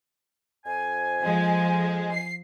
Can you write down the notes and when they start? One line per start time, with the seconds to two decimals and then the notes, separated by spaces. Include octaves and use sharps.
0.66 F2 C5 G#5
1.20 F3 G#3
2.12 C7